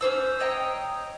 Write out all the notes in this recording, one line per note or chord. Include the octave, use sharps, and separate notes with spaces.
C#4 F#4 C5 E6
C#5 D#5 G5 A#5